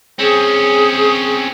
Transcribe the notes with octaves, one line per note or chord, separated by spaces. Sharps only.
C4 C#4 G#4